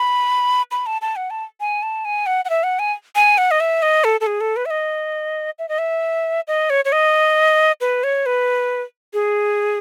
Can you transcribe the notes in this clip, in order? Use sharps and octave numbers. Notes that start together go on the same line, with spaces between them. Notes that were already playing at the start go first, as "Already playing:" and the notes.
Already playing: B5
B5
A5
A5
F#5
A5
G#5
A5
G#5
F#5
F#5
E5
F#5
G#5
G#5
F#5
D#5
E5
D#5
A4
A4
G#4
A4
B4
E5
D#5
E5
D#5
E5
D#5
C#5
C#5
D#5
B4
C#5
B4
G#4